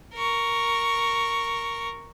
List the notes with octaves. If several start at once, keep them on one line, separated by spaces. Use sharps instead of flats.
A#4 C#6